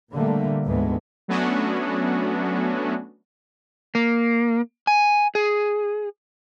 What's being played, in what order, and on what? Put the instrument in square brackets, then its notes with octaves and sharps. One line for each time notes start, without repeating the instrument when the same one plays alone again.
[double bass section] A#2 D3 G3 A3 A#3
D2 G#2 E3 G#3 A3 B3
[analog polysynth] F#3 A3 B3 C#4 D4 F#4
[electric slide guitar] A#3
G#5
G#4